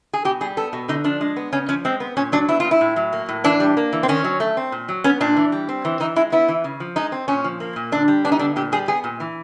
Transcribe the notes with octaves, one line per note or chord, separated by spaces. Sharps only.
G#4
B2 G4
G3 G#4
B3 A4
B2
D3 D#4
F3 D4
G#3
B3
C#3 C#4
F3 C#4
G#3 C4
B3
A#2 C#4
F#3 D4
B3 E4
A#2 F4
E4
A2
F#3
A#3
A2
E3 D4
G3
A#3
E3
C4
D#3 C#4
F#3
A3
C4
A#2
F#3
B3 C#4
A#2 D4
E3
G3
C4
E3
E3 D#4
G#3 E4
B3 E4
E3
C#3
F3
G#3 D#4
C4
A#2 C#4
F3
A#3
A#2
D3 D4
G3
B3 D4
D#4
D3 D4
A#2 G4
G3 G#4
B3 G#4
A#2
E3